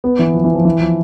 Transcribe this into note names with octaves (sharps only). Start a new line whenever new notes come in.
B3
E3
F3
E3
F3
E3
F3